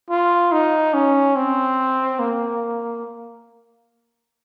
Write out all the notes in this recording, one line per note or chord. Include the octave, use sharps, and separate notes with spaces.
F4
D#4
C#4
C4
A#3